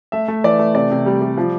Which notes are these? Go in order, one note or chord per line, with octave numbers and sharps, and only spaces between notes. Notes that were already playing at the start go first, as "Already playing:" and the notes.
A3 E5
A3
E3 D5
A3
C3 D5
C3
G3
G3
F3